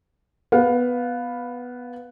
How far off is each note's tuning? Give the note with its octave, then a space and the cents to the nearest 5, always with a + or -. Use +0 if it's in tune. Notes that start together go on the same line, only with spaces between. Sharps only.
B3 +0 F5 +20